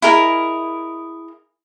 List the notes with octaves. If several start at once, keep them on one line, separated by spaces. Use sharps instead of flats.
E4 G#4 A#4 D#5